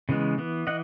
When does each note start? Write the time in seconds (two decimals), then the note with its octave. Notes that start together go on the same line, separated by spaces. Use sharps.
0.09 C#3 E3 G#3 B3
0.38 E3 B3
0.67 E3 D#5 F#5